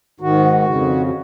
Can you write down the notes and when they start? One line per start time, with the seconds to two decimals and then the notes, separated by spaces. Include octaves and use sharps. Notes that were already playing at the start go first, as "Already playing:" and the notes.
0.20 G#2 D#3 F#4
0.66 F2 C#3